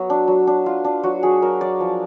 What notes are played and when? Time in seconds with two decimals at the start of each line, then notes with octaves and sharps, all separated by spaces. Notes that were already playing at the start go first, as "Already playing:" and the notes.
Already playing: F#3 B3
0.10 D4
0.28 F#3
0.47 D4
0.66 F4
0.84 D4
1.03 F#3 F#4
1.23 F#3 G#4
1.42 F#3 A#4
1.61 F#3 D5
1.81 F3